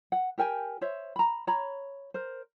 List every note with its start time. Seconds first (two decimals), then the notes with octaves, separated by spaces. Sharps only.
0.12 F#5
0.38 G4 A#4 G5 G#5
0.81 C5 C#5 E5
1.16 A#5 B5
1.47 C#5 A#5 B5
2.14 A#4 C5